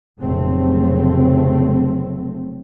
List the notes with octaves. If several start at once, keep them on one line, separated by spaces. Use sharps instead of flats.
F1 A#2 C#3 F#3 A3 C4